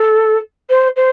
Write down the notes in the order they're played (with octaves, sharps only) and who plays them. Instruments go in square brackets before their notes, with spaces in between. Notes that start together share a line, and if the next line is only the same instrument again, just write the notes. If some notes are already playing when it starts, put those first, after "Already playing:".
Already playing: [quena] A4
C5
C5